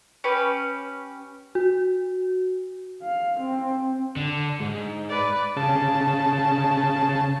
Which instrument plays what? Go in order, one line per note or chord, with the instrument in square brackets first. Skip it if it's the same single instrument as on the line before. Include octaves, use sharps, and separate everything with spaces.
[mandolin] C#4 G4 B4
[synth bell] F#4
[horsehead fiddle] F5
C4
[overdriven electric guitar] D3
G#2
[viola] B4 D5
[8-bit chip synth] C#3 A5